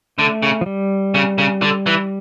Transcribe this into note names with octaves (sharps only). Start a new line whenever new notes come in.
D3 A3
C#3
F3
G3
C#3
C#3
D3
E3